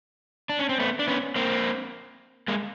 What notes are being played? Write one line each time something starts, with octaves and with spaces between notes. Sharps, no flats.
D4
C#4
C4
A3 B3
D4
B3 C#4
A#3 C4
G#3 A#3